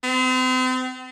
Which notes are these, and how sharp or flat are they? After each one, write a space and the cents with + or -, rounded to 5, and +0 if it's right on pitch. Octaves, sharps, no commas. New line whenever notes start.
C4 -40